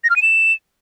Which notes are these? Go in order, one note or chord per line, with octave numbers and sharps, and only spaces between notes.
A#6
F6
D#7
E7